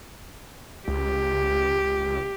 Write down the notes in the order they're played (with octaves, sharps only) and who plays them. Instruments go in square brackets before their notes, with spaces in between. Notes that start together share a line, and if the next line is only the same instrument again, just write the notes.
[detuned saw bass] C#2 [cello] G4